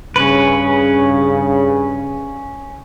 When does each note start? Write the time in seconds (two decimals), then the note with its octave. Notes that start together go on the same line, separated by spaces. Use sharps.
0.16 G2 C#3 C#4 B4